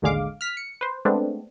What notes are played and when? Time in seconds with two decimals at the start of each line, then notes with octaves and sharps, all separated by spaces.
0.02 A1 D#2 D3 G#3 F5 D6
0.41 F6 B6
0.57 C#7
0.81 B4 C5
1.05 G#3 A3 B3 C4 D4